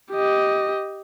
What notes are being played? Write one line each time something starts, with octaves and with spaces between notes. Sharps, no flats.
G4 D#5